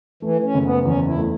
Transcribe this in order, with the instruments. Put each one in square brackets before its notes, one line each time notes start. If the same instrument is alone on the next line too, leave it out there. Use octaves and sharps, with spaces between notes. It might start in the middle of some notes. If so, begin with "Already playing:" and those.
[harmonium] E3 [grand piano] A3
[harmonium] C#4
[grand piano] F#1
[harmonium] B3
[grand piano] E2 [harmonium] C#4
[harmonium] E4
[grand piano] A3